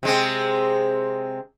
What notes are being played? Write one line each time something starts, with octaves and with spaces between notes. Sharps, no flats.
C3 G#3 C4